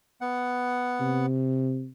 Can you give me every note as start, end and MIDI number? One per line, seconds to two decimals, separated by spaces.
0.21 1.26 59
0.21 1.26 78
1.00 1.89 48